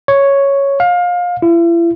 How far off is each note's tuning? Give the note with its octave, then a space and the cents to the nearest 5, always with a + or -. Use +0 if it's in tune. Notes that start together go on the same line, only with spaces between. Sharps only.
C#5 +0
F5 +25
E4 +40